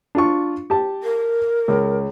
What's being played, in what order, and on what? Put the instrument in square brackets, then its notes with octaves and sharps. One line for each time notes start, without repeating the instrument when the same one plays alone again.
[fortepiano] D4 F4 C#6
G4 A5
[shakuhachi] A#4
[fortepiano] C#2